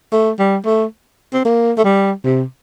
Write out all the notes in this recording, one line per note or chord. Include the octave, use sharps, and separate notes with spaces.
A3
G3
A3
C4
A#3
A3
G3
C3